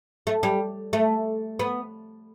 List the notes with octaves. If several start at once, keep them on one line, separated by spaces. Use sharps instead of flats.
A3
G3
A3
B3